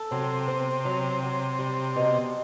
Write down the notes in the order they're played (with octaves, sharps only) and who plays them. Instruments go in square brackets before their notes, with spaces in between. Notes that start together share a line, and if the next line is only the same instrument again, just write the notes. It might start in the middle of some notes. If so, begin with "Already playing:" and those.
Already playing: [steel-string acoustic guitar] A4
[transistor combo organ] C3 [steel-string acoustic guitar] F#3
[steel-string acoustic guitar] C4
F#3
F#3
G3
B2